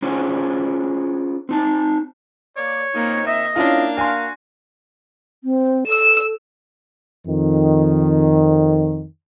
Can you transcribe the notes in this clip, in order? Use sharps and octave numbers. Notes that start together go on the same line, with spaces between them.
C#4 D4 F4 G#4 C5 C#5
C4 D#4 A5
A#3 C#5 D5
A#2 A#3 C4 D#4
D#5 E5
A#3 C#4 D4 E4 F4 F5
F#4 G#5 C6
C4
A4 E6 E7
F2 D#3